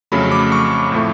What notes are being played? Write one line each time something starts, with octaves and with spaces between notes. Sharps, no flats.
F2 C#3 F#3 A3 B5
D6
C#6
A2 F3 A3